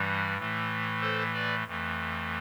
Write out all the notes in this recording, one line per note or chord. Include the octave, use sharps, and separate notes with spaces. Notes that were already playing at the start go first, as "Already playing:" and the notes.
Already playing: G2 E3 G3
A2 E3 A3
A4 C5
B4 D5
F2 E3 A3